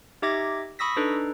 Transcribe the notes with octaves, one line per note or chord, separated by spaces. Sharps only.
D#4 G4 E5 D6 G#6 A#6
B5 C#6 D#6 E6 A#6 B6
D4 D#4 A4 B4